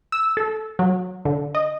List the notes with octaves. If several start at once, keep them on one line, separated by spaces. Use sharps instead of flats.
E6
A4
F#3
D3
D#5